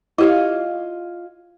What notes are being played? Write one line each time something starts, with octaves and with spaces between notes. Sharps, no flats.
E4 F4 G4 C#5 D#5